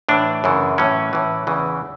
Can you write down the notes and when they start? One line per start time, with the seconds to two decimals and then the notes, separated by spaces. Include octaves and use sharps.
0.09 A2 E3 D4
0.44 F#2 C#3 E3
0.78 A2 E3 C#4
1.13 A2 E3
1.47 E2 C#3 E3